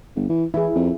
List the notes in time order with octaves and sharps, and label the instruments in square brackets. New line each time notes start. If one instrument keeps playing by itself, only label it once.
[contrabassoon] G1
E3
[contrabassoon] E3 [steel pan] E4 G#4
[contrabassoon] F2